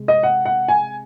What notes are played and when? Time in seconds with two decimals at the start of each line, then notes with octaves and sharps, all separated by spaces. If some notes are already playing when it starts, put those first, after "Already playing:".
Already playing: C3 G#3
0.08 D#5
0.23 F#5
0.45 F#5
0.68 G#5